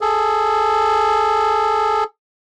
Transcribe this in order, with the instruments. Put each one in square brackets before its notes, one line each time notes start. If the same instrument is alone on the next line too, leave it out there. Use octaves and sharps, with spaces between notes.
[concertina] G#4 A4